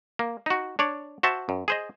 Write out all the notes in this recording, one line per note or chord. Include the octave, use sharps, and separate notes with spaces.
A#3
D#4 F#4
D4 C#5 D5
F#4 C5 E5 A5
F#2
G#4 C5 D#5